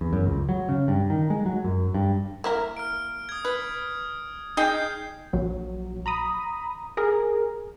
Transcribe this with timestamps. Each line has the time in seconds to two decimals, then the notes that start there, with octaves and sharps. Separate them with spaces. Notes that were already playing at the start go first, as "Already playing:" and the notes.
0.01 E2
0.13 F#2
0.26 C#2
0.49 F#3
0.69 C#3
0.88 G2
1.10 D#3
1.30 G#3
1.46 F#3
1.65 F#2
1.94 G2
2.44 A#3 E4 A#4
2.77 F6 D7
3.29 D#6 G#6
3.45 B4
4.57 D#4 G#4 D#5 G5 G6 C7
5.33 A#1 F#3
6.06 A#5 B5 D#6
6.97 G#4 A#4